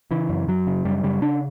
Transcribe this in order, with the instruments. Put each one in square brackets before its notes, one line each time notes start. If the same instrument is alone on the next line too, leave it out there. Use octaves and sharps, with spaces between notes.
[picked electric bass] C#3 E3
F#2
F#2 F#3
C#3
F#2 G3
C#3 G3
C#3 D4